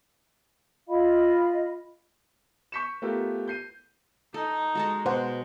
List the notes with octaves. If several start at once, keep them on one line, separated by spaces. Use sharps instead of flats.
F4 D#5 F5 B5
C#6 G6 B6 C#7 E7
A3 B3 F4 G4 A4 A#4
G6 C7 D#7
D#4 A4
G#3 F#4 A4 A5
B2 C5 F#5